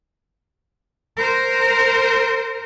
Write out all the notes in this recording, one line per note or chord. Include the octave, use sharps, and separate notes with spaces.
A#4 C5